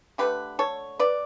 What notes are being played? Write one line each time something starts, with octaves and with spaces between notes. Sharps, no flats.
D3 F#3 A3 G4 B4
A4 C#5
B4 D5